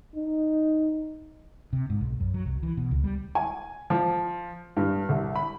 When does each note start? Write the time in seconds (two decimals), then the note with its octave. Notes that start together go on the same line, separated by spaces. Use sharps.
0.15 D#4
1.73 C3
1.90 G#2
2.01 B1
2.20 F#2
2.34 F#3
2.46 C2
2.63 E3
2.77 B2
2.91 C#2
3.04 G3
3.35 G#5
3.90 F3
4.77 G2
5.09 C2
5.36 B5